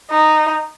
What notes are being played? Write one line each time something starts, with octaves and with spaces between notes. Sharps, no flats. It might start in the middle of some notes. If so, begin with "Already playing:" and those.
D#4